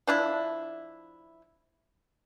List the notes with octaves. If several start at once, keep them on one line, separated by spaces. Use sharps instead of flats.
F3 D4 E4